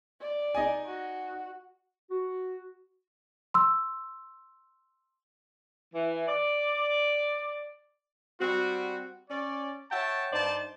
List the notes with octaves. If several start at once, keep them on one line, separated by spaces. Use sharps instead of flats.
D5
D#4 D#5 G#5
F#4
F#4
C6 E6
E3
D5
G3 C4 F#4
C#4 D5
C#5 E5 F#5 G5 A5
G2 D#4 C5 D5 A5